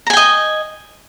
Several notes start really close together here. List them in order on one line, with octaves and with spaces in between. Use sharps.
A#5 G#5 G5 D#5